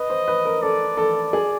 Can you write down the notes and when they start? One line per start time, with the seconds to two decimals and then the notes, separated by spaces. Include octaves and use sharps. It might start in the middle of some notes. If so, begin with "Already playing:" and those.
Already playing: B4 D#5
0.10 C5
0.28 B4
0.45 A#4
0.63 A4 D5
0.97 A4
1.33 G#4